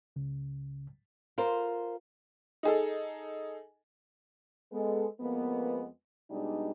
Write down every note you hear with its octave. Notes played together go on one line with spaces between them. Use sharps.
C#2 C#3
F4 A#4 C5
D#4 G#4 A4
G#3 B3 A4
F2 G#3 A#3 B3
B2 G3 G#3 D4 D#4